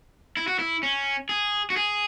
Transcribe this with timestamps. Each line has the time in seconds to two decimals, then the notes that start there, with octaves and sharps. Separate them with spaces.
0.37 E4
0.48 F#4
0.59 E4
0.83 C#4
1.29 G#4
1.70 F#4
1.76 G#4